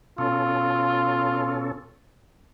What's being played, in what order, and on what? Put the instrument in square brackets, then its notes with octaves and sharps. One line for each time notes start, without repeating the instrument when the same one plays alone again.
[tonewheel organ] B2 C#4 A4 [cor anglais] F4